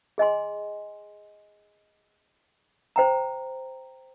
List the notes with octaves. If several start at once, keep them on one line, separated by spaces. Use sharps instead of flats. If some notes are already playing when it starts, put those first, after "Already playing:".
G#4 D#5 G#5 C6
C5 G5 A#5